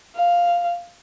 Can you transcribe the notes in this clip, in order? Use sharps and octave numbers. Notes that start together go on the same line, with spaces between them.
F5